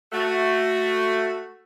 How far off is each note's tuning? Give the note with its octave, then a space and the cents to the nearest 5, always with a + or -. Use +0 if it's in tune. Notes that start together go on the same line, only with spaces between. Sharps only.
A3 +10 F#4 +0